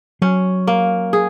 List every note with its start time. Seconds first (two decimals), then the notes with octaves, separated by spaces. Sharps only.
0.22 F#3 C#4
0.67 A#3
1.13 G#4